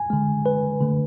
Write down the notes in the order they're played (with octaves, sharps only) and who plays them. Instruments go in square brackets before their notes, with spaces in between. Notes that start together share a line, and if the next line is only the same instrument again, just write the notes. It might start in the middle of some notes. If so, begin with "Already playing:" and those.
Already playing: [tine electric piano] G#5
D3 G#3
B4
D3 A3